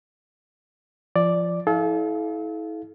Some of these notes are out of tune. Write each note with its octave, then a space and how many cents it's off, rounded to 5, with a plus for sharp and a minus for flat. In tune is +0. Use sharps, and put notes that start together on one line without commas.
F3 -15 D5 +0
E4 -35 A4 -40 F5 +0